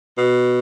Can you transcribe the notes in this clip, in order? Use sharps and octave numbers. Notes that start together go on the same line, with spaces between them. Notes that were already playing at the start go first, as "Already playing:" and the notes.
B2